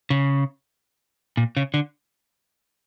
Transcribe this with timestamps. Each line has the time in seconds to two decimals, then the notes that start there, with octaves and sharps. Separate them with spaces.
0.10 C#3
1.37 A#2
1.57 C#3
1.74 D3